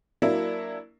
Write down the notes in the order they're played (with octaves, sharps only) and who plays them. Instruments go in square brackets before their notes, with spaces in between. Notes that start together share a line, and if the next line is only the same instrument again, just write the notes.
[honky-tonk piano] F#3 A#3 D4 E4